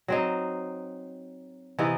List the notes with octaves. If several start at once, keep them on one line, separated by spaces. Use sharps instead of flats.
F#3 C4 D#4
C3 E3 B3 D#4